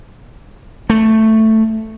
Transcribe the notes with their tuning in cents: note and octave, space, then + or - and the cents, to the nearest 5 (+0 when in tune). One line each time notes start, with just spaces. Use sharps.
A3 +5